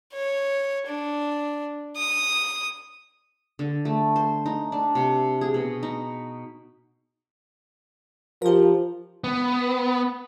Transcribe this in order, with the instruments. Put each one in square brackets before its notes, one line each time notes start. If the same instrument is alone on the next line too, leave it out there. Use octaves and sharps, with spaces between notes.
[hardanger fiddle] C#5
D4
D#6
[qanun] D3
A3
C5
D#4
D4
C3
G#4
B2
D#4
[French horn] F3 [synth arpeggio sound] G4 A#4
[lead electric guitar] B3